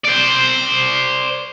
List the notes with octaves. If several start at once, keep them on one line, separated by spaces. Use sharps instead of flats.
C5 D5